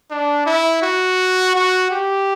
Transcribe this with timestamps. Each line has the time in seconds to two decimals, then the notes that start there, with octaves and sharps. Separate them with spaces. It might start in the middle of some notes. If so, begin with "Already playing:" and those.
0.11 D4
0.46 E4
0.82 F#4
1.55 F#4
1.91 G4